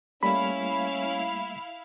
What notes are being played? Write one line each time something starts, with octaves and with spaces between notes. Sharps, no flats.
G3 A3 A#3 C#4 E4 F5 B5